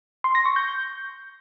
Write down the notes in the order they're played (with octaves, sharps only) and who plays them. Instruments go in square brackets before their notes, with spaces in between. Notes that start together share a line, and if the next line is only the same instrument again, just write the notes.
[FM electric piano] C6
A#6
C#6
G6